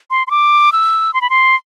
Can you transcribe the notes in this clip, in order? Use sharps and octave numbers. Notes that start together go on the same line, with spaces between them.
C6
C6
D6
E6
C6
B5
C6